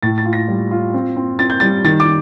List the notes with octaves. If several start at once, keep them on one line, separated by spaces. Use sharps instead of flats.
A2 A6
A6
F4
A#6
G3
F4
C4
C4
C4 A6
G6
G3 A6
D#3 A6
D6